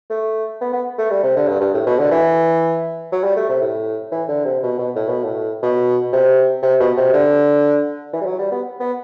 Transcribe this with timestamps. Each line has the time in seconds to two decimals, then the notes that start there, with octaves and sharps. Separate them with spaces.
0.10 A3
0.61 B3
0.73 B3
0.98 A3
1.10 G3
1.23 C3
1.36 D3
1.48 G2
1.61 G2
1.74 A2
1.86 B2
1.99 D3
2.12 E3
3.12 F#3
3.24 G3
3.36 A3
3.49 C3
3.62 A2
4.12 E3
4.28 D3
4.45 C3
4.63 B2
4.78 B2
4.96 A2
5.09 B2
5.23 A2
5.63 B2
6.13 C3
6.63 C3
6.80 B2
6.97 C3
7.13 D3
8.13 E3
8.21 G3
8.26 F#3
8.39 G3
8.52 B3
8.80 B3